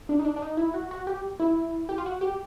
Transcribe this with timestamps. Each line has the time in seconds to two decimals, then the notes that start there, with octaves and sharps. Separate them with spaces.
0.09 D4
0.19 D#4
0.25 D4
0.36 D4
0.42 D#4
0.57 E4
0.74 F#4
0.91 F#4
1.07 G4
1.40 E4
1.89 G4
1.98 F4
2.06 F#4
2.21 G4